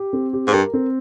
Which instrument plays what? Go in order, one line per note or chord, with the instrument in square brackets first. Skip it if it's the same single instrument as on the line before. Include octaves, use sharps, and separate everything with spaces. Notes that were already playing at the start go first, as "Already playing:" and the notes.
Already playing: [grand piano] G4
C4
G4
[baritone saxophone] G#2
[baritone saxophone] G2 [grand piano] A#4
[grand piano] C4